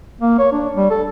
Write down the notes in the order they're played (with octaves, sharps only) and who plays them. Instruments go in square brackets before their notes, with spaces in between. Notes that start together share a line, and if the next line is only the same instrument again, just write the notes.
[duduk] A#3
C#5
D4
G3
A4